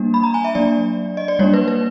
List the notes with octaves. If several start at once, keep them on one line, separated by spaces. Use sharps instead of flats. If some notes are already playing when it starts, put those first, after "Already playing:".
Already playing: G3 A#3 D4
B5
A#5
G#5
E5
F#3 A#3 D4 D5
D#5
D5
G3 A#3 D4 C#5
B4
B4